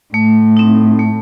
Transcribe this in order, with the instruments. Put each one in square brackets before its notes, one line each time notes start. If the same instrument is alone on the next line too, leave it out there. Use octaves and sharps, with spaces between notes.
[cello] A2 [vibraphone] A3
[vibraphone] C4 D#4
A3